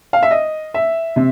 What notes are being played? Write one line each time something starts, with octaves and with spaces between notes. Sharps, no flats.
F5
E5
D#5
E5
C3